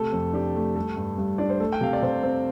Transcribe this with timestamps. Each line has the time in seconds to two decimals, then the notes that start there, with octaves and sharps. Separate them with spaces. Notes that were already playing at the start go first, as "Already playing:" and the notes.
Already playing: C3 A3 A4
0.12 F2
0.33 D4 G4
0.56 A3
0.76 G3 A4
0.97 G2
1.18 G2
1.38 D4 D5
1.50 C5
1.60 A3 A4
1.72 G5
1.81 C3 F5
1.93 D5
2.03 C3 C5
2.23 C4